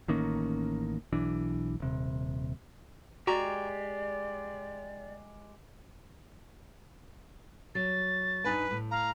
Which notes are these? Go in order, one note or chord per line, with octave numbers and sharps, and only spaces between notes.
A1 D#3 A#3 C#4
B1 E3 D4
D#1 C3
G#3 F#4 G4 D5 A#5
F#3 A6
G2 D#4 B4 G#5
A2
F5 A#5